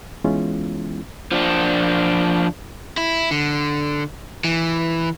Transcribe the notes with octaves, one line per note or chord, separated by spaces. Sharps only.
E3 G#3 B3 C#4 E4 F4
F3 D4
E4
D3
E3